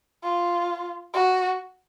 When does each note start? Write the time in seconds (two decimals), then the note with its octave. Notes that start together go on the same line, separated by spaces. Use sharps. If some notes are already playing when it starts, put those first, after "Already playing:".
0.23 F4
1.14 F#4